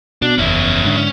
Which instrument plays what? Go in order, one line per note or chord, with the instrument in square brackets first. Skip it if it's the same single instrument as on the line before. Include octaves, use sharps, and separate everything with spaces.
[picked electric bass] B2 [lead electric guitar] D4
[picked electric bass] F#1 E2 [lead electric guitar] C#4 E4
[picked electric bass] G#2 D3
[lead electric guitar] C#4